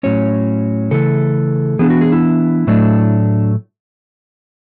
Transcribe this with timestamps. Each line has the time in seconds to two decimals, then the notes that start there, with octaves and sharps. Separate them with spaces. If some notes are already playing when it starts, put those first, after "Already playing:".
0.03 A2 F#3 C#4 C#5
0.91 C#3 E3 A3 A4
1.79 E3 B3 D4 G#4
1.90 F#4
2.01 G#4
2.12 E4
2.67 A2 F#3 A3 D4